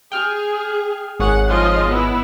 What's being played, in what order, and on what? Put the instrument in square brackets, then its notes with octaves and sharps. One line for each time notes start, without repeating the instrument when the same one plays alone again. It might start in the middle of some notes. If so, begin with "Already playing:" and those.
[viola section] G#4 [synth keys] G5 F6
[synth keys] G#1 G#4 C#5 [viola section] F#5
[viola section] F3 F4 D#5
B3 E4